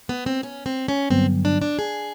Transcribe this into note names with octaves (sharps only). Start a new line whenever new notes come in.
B3
C4
C#4
C4
C#4
G2 D3 F#3 B3 C4
D4
D4
G#4